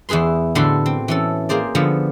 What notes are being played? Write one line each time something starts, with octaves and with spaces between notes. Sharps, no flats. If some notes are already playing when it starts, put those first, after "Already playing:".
E2 E4 G#4 B4 C6
A2 D3 F#4 A4 B4 C6
C4
E3 C#4 A4
A#3 G#4 C5 D5
D3 F3 B3